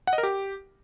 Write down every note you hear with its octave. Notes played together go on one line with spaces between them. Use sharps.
F#5
D#5
A#4
G4